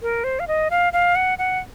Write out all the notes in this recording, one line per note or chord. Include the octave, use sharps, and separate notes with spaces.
A#4
C5
F5
D#5
F5
F5
F#5
F#5